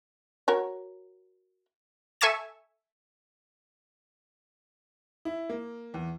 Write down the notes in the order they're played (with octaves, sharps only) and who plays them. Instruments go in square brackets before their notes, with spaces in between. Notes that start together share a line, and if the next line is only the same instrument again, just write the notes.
[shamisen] F#4 A#4 C#5
[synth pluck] A4 E5 G#5 C#6 G#6 E7
[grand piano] E4
A#3
E2